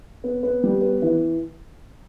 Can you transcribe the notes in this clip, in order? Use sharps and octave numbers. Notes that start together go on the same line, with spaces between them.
B3
B3
G3
B3
E3